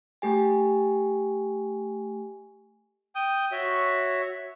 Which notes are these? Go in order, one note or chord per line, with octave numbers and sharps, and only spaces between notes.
A3 G4 G#5
G5 D#6 G6
F#4 C#5 E5